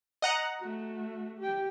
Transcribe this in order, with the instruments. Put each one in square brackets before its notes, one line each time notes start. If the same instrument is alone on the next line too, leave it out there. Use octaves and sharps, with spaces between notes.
[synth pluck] D#5 F#5 A#5
[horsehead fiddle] A3 F#4
G4 G5